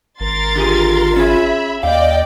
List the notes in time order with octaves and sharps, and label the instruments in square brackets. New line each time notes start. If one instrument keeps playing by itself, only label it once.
[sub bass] G#1 [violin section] A#4 C6 A6
[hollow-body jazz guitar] D3 G4 G#4 [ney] F4
[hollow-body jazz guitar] C#4 G#4 [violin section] E5 B5
[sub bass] D#2 [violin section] D5 G5 [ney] D#5 [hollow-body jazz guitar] F5